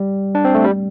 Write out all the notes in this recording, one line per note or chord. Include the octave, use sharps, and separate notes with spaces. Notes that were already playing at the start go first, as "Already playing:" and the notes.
Already playing: G3
D4
C4
A3
G3